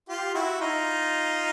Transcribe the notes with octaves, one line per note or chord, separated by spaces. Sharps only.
F4 G4
E4 F#4
D#4 F4